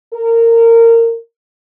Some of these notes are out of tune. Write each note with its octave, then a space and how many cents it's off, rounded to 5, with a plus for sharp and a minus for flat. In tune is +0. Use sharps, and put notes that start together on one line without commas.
A#4 -20